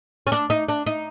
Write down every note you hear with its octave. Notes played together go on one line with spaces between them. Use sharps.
C#4
D4
D#4
D4
D#4